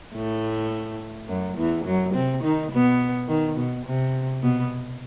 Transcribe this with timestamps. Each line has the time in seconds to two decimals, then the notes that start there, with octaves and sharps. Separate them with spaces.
0.15 A2 A3
1.28 F#2 F#3
1.57 E2 E3
1.85 F#2 F#3
2.14 C3 C4
2.43 D#3 D#4
2.72 B2 B3
3.28 D#3
3.57 B2
3.86 C3
4.42 B2 B3